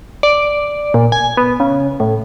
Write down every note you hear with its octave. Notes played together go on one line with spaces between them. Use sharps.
D5
A#2
G#5
B3
C#3
A2